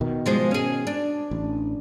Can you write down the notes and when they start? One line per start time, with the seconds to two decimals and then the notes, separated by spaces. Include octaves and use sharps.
0.01 B2 D#3
0.26 F3 G#3 C5
0.51 C#4 G#4
0.87 D4
1.31 A1